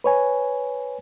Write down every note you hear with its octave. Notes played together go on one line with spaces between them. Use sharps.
B4 C#5 G#5